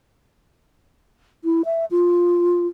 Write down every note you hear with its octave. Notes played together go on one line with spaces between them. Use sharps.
E4
E5
F4